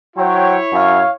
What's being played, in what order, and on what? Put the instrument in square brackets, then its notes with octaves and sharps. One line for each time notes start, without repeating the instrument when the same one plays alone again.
[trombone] F#3 [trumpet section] E4 C#5 [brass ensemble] C5 F#5 G5
[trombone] F#2 [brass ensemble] F5